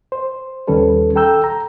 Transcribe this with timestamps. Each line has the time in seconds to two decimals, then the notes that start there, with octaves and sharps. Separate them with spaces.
0.12 C5
0.67 D#2 D#3 G3 C#4 A4 B4
1.16 A4 G5 A#5 E6 G6
1.44 A#5